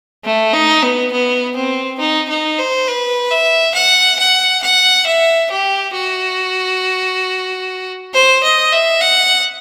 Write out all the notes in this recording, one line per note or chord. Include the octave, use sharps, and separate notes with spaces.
A3
D#4
B3
B3
C4
D#4
D#4
C5
B4
E5
F#5
F#5
F#5
E5
G4
F#4
C5
D#5
E5
F#5